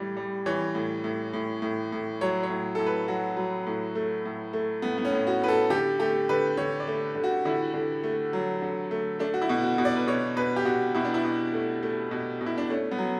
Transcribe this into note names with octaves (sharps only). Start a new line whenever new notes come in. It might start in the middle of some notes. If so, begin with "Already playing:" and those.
Already playing: A2 E3 G3
G3
E3 C#5
A2
A2
A2
A2
A2
F#3 C#5
C#5
A2
A2 A4
B4
F#3 F#4
F#3
A2
A3
A2
A3
A2 B3
B3
C#4
A2
F#4
A2 B4
A4
D3 G4
A3 G4
D3 B4
D3 C#5
D5
A3
D3
F#4
D3 E4
D3
A3
F#3
D3
A3
A3 D4
F#4
E4
B2
F#4
B2
D5
B4
B2 C#5
B2 B4
G4
B2 F#4
B2 E4
D4
E4
B2
A3
A3
B2
B2
E4
D4
A3 C#4
B3
F#3